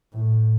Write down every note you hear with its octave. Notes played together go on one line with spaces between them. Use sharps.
A2